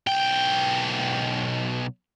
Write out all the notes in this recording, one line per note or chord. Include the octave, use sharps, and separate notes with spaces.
B1 G5